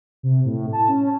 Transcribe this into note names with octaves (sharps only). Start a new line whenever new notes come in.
C3
A2
A5
C#4